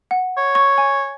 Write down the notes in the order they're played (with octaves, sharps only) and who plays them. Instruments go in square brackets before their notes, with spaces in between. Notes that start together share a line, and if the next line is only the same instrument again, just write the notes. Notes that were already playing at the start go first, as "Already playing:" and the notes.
[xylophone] F#5
[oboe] C#5
[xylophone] C#6
G#5